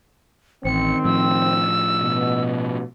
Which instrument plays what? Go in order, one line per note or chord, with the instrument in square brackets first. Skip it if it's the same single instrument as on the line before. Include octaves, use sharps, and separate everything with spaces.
[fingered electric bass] A1 [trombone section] D#3 C4 [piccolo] C#7
[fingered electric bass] A2 F3 [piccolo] E6
[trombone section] B2